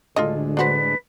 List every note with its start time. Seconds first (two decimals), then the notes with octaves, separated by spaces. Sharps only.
0.16 D2 A2 D3 G#3 F4 A4 D#5
0.57 D4 F#4 B4 C5